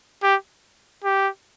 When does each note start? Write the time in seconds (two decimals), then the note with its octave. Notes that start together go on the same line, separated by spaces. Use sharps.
0.23 G4
1.04 G4